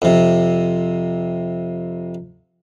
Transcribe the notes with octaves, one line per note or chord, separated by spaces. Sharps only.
F2 C3